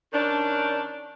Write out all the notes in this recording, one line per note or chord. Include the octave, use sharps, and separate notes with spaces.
D#3 C#4 D4